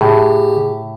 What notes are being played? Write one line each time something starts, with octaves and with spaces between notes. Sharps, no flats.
A2 C#3 G4 G#4